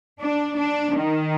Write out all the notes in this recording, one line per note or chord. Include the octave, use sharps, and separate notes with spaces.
D4
D4
D#3